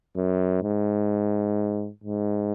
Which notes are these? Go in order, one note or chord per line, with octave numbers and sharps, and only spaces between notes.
F#2
G#2
G#2